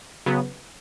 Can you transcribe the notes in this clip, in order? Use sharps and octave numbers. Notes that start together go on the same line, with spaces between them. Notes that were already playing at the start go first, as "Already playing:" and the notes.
C#3 F#3 B3